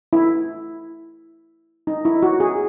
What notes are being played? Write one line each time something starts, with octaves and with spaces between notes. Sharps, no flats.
E4
D#4
E4
F#4
G#4